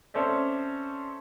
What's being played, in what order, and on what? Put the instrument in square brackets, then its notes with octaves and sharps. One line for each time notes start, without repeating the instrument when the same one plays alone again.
[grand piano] C4 C#4 A4 C5 D5 E5